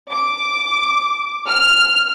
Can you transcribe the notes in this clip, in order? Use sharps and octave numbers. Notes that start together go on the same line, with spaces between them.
D6
F6